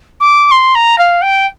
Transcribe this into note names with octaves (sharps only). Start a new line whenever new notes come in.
D6
C6
A#5
F5
G5